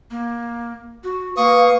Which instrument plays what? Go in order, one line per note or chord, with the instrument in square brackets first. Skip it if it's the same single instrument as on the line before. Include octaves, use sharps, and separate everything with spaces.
[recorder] A#3
F#4
[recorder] A#3 [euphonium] B4 [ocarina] F5 [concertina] C#6 D#6